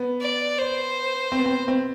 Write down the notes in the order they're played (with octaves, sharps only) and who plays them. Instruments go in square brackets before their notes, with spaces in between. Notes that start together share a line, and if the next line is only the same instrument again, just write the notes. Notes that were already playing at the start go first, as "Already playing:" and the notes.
Already playing: [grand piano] B3
[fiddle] D5
C5
[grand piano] C4
B3
C4
C4